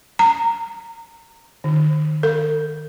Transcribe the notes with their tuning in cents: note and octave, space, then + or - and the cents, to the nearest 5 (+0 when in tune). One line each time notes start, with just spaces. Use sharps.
A#5 -25
D#3 -30
A#4 -45